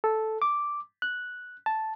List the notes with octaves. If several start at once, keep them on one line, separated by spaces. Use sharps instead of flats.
A4
D6
F#6
A5